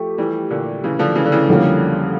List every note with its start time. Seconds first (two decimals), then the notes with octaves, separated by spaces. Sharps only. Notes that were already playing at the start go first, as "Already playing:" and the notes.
Already playing: F3 A3 G4
0.18 E3 G3
0.50 A#2 D3
0.84 C#3 E3
0.99 D3 F3
1.15 C#3 E3
1.26 D3
1.32 C#3 E3
1.48 F2 D3 G3 A#3 C#4